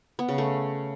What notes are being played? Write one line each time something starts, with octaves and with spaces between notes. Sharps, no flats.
B3
C#3
A3